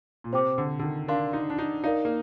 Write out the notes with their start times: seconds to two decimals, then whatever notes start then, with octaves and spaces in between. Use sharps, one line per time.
0.24 A#2
0.33 C3 C5 G5 D6
0.58 D3
0.79 D3
0.83 D#3
1.08 D4 A#4 F5 C6
1.33 D#4
1.50 D4
1.58 D#4
1.84 D#4 A#4 D5 F5
2.05 A#3